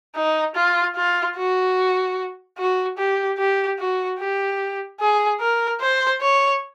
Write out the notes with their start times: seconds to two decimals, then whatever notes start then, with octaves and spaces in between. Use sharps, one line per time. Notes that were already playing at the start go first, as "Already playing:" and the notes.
0.16 D#4
0.55 F4
0.96 F4
1.36 F#4
2.58 F#4
2.98 G4
3.38 G4
3.79 F#4
4.19 G4
5.00 G#4
5.40 A#4
5.81 C5
6.21 C#5